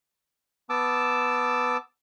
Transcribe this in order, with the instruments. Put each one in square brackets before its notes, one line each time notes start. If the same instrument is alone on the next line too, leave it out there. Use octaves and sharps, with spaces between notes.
[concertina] B3 A5 D6 E6